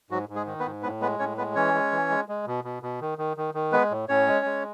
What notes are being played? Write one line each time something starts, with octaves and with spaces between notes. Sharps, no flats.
G#2 F#3 F#4
G#2
G#3 G#4
D#3
B3 B4
G#2
A2 B3 B4
G#3 B3 B4
A2 C#4 C#5
G#3 B3 B4
E3 C#4 C#5
G#3
E3
G#3
G#3
B2
B2
B2
D#3
D#3
D#3
D#3
G#3 B3 B4
A2
A2 C#4 C#5
G#3
G#3